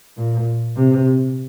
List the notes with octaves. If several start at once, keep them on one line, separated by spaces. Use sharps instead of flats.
A#2
C3